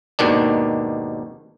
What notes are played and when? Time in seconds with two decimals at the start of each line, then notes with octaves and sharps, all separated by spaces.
0.19 D#2 G#2 B2 D#3 D4